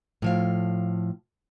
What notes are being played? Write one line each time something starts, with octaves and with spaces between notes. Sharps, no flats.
A2 F3 F5